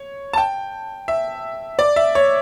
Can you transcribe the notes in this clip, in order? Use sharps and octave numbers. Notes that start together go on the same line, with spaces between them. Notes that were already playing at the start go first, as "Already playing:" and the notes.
Already playing: C#5
A5
G5
E5
D5
E5
C#5